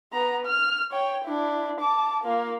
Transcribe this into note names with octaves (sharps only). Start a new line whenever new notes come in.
B3 A#5
F6
C#5 G5
D4 E4
A5 D6
A#3 F4